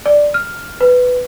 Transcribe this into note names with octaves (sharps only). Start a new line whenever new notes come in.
D5
F6
B4